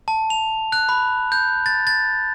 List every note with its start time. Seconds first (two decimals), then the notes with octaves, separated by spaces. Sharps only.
0.08 A5
0.30 F7
0.72 F#6
0.89 B5
1.32 G6
1.66 A6
1.87 A6